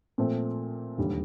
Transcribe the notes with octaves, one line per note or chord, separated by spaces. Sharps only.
A#2 F3 A3 C4
E1 D#2 D3 G3